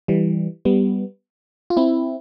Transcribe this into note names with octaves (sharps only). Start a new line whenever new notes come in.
E3 G3
G3 B3
F4
C4 E4